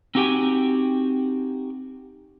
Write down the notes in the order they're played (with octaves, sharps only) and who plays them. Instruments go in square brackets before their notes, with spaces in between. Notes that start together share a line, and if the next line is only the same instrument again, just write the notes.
[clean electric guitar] C4 D#4 F#4 G4 G5 G#5